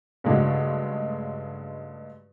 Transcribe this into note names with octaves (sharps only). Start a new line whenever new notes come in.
G2 C#3 G#3 A3 D4 F#4